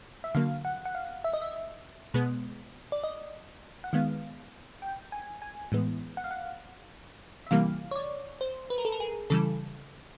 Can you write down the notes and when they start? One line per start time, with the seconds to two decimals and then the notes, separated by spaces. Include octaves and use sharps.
0.24 E5
0.35 D3 F#3 A#3 F5
0.65 F#5
0.85 F#5
0.95 F5
1.24 E5
1.33 D#5
1.42 E5
2.14 B2 G#3 B3
2.92 D5
3.04 D#5
3.84 F#5
3.93 D#3 G#3 B3 F5
4.82 G5
5.12 G#5
5.42 G#5
5.72 A2 E3 G#3 B3
6.17 F#5
6.24 F5
6.31 F#5
7.47 E5
7.51 C3 E3 G3 A#3 F5
7.91 C#5
7.96 D5
8.41 C5
8.70 B4
8.78 A#4
8.85 A4
8.92 A#4
9.00 G#4
9.30 C#3 E3 G3 A4